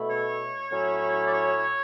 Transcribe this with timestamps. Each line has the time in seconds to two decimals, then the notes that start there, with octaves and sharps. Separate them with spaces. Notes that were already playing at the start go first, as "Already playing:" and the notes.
Already playing: B2 A3 E4
0.10 C#5
0.71 A2 F#3 C#4 E4
1.26 D5
1.33 C#5